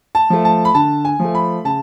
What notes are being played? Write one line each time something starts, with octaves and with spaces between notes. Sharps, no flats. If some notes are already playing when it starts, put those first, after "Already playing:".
A5
F3 A3
A5
B5
D3 A5
G#5
F3 A3
B5
C#3 A5